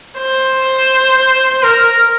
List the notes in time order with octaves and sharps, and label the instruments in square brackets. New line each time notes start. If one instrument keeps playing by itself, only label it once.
[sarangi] C5
A#4